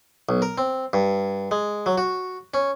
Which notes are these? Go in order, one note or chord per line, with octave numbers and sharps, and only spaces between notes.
B1
A#4
C4
G2
G#3
F#3
F#4
C#4